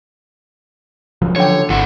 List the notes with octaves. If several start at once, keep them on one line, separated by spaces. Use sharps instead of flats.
C#3 F3 F#3
D3 C#5 G5
G#1 A#2 E4 F#5